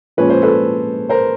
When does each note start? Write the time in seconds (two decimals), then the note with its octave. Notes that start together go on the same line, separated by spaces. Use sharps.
0.17 A#2 F3 G#3 C#4 B4
0.30 C5
0.42 A4 B4
1.09 A#4 C5